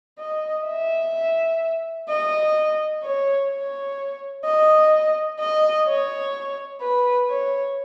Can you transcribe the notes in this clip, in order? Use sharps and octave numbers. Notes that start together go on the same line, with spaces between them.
D#5
E5
D#5
C#5
C#5
D#5
D#5
C#5
B4
C#5